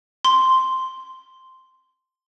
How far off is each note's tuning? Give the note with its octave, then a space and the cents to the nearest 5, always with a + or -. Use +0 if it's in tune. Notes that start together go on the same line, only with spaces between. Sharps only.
C6 -5